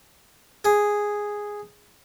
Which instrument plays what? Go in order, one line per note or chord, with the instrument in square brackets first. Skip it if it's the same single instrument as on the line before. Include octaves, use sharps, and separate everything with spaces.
[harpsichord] G#4